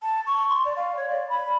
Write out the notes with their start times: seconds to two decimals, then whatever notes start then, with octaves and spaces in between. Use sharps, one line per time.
0.02 A5
0.27 C#6
0.49 C6
0.65 D5
0.76 F5
0.97 C#5
1.10 D5
1.29 B5